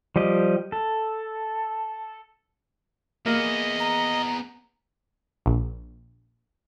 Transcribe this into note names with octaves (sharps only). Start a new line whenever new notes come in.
F3 G3 G4 D#5
A4
A#3 B3 G#4 D#5
A#5
A#1